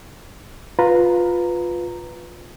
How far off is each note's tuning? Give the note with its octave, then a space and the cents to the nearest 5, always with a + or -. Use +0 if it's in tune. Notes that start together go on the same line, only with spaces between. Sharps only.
F4 +15 B4 +0 A#5 -10